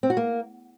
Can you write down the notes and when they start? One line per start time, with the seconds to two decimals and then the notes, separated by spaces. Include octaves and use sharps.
0.03 C4
0.10 F#4
0.17 A#3